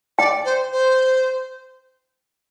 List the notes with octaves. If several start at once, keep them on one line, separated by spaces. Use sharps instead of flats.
D5 G5
C5
C5